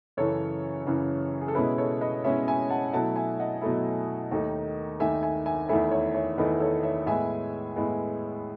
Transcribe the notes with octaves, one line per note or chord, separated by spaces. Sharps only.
F#2 C#3 E3 A4 C#5
F#2 C#3 E3
G#4
A4
B2 G#3 C#4 E4 G#4 B4
A4 C#5
B4 D#5
B2 G#3 C#4 E4 C#5 E5
E5 G#5
F#5 A5
B2 F#3 A3 E4 F#5 A5
E5 G#5
D#5 F#5
B2 F#3 A3 E4
D#2 D#3 A3 D#4
D#2 D#3 A3 D#4 E5 G#5
E5 G#5
E5 G#5
E2 D#3 A3 E4 E5 G#5
C#5 E5
C#5 E5
E2 D#3 A3 E4 B4 D#5
A4 C#5
C#5 E5
A2 G#3 B3 E5 G#5
A2 G#3 B3